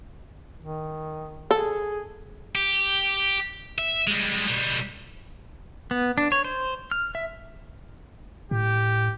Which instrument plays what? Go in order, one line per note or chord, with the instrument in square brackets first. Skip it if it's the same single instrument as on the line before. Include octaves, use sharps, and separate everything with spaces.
[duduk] D#3
[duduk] G#4 [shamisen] A4
[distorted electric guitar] G4
E5
G3 G#3
B2 G3
[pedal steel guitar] B3
D4
C#5
C5
F6
E5
[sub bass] A2 [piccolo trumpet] G4